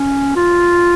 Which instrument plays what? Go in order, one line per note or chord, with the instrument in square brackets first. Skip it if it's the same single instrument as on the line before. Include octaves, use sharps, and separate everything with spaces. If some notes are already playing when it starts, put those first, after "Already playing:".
Already playing: [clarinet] C#4
F4